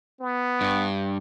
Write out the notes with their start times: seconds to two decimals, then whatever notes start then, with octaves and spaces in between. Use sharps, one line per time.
0.21 B3
0.61 G2